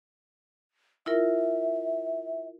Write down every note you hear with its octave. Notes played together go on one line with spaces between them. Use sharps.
E4 F4 A#4 E5